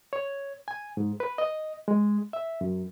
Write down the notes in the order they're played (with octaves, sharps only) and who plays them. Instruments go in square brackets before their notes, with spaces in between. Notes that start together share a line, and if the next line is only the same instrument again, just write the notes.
[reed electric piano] C#5
G#5
G#2
B4
D#5
G#3
E5
F#2